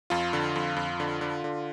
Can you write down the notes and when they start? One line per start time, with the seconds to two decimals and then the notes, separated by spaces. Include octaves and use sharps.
0.10 F2 F4
0.33 D3
0.56 F2
0.77 F2
1.00 D3
1.21 D3
1.44 D3